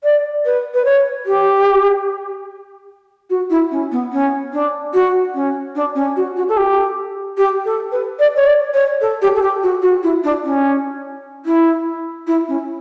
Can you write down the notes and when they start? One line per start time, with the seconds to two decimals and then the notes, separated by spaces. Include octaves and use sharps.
0.04 D5
0.45 B4
0.74 B4
0.85 C#5
1.26 G4
3.30 F#4
3.50 E4
3.71 C#4
3.92 B3
4.12 C#4
4.53 D4
4.94 F#4
5.35 C#4
5.75 D4
5.95 C#4
6.16 F#4
6.36 F#4
6.49 A4
6.57 G4
7.37 G4
7.65 A4
7.92 B4
8.19 D5
8.36 C#5
8.47 D5
8.74 C#5
9.01 A4
9.22 G4
9.36 A4
9.42 G4
9.63 F#4
9.82 F#4
10.03 E4
10.24 D4
10.44 C#4
11.45 E4
12.27 E4
12.48 C#4